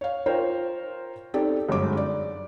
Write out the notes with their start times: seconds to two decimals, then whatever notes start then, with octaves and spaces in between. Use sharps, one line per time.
0.01 C#5 F5
0.26 F4 A#4 C5 C#5 G5
1.34 C4 D#4 G4 A4 D5
1.69 G1 F#2 G#3 D6
1.97 D5